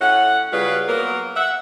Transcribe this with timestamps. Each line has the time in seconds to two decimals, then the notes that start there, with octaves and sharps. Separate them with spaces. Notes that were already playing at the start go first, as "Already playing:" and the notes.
0.01 A2 C#4 F#5
0.52 C#3 F#3 G3 F4 B4
0.88 F#3 A#3 B3 A#4
1.37 E5 F#5